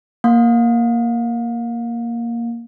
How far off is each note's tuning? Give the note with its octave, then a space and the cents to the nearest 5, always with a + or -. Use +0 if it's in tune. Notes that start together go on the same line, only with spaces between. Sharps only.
A#3 +0 F5 +35